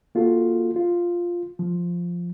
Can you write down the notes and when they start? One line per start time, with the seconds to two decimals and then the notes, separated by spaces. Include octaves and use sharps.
0.15 A#3 F4 F#4 A4
0.76 F4
1.59 F3